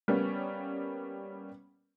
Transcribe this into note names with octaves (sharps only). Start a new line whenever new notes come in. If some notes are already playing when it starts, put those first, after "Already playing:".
G3 A#3 B3 C#4